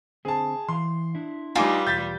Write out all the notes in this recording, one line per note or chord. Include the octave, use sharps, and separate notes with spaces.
D3 C4 G#4 C5 A5
E3 F5 C6
D4 E4
G3 D#4 F4 B4 G#5 D6
B1 E2 G4 G6 A6 B6